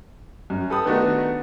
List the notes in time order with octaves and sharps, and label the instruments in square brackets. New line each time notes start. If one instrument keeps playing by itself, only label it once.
[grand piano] F#2
[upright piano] G4 B4 D#6 [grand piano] A4
[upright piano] D#3 A3 D#4 [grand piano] B3 D4 F#4